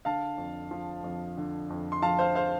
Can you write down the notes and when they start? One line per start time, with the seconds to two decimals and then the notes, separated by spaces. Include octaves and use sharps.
0.05 D3 F5 A5
0.38 F2
0.71 F3
1.04 F2
1.38 D3
1.70 F2
1.92 C6
2.02 F3 F5 A5
2.19 C5 F5
2.35 C5 F5